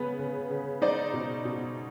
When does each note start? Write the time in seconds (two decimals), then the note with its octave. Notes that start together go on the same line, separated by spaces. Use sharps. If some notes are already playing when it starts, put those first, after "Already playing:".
Already playing: C#3 B3 B4
0.19 C#3
0.50 C#3
0.82 D#4 C5 D5
1.13 B2
1.45 B2